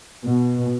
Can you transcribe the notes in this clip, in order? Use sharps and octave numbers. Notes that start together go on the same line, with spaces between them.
B2